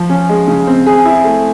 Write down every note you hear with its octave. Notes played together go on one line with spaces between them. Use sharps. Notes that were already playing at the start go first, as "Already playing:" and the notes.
Already playing: F3
C#4
G#3
C#3
C4
G#4
E4
A3